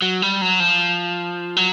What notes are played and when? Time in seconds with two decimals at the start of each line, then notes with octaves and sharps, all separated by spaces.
0.02 F#3
0.22 G3
0.42 F#3
0.60 F3
1.57 F#3